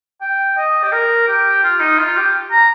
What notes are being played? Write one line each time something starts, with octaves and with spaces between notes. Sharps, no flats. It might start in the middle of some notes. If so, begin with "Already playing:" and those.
G5
D#5
G4
A#4
G4
F4
D#4
F4
G4
A#5